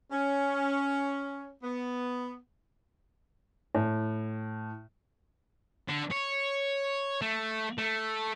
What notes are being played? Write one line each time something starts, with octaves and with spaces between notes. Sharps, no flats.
C#4
B3
A2
D3
C#5
A3
A3